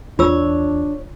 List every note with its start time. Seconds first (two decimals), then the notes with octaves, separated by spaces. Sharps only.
0.19 E2 D4 F4 C#5 E6